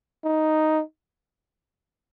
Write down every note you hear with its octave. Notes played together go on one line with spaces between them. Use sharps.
D#4